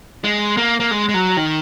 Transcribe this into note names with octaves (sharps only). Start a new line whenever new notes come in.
G#3
A#3
A#3
G#3
G#3
F#3
D#3